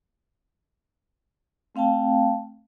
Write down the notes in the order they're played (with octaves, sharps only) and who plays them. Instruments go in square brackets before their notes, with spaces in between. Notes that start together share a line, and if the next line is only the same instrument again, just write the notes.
[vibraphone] A3 C4 F5 G5 A5